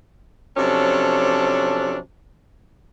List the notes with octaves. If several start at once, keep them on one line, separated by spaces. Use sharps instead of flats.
C3 F3 F#3 C#4 D4 A4